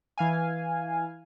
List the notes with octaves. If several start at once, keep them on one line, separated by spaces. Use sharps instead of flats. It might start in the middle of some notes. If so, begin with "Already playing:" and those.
E3 F5 G#5